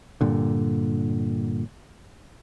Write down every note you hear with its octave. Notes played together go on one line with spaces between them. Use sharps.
G2 A#2 D3